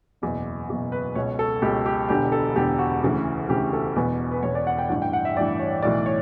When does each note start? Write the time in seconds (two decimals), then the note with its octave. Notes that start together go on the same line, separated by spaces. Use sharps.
0.22 F#1 E2 B2
0.69 F#1 E2 B2
0.92 B4
1.15 C#2 B2 C#5
1.39 A4
1.62 C#2 B2 G4
1.86 G4
2.09 E1 E2 D3 G4
2.32 A4
2.56 E1 E2 D3 G4
2.79 F#4
3.03 D2 C#3 E3
3.49 D2 C#3 E3 G4
3.73 A4
3.96 E1 E2 B2 B4
4.31 B4
4.43 E1 E2 B2 C#5
4.55 D5
4.67 F#5
4.79 G5
4.89 A1 G2 E3 F#5
5.02 G5
5.13 F#5
5.25 E5
5.36 A1 G2 E3 D5
5.60 C#5
5.82 B1 A2 E3 D5
6.06 C#5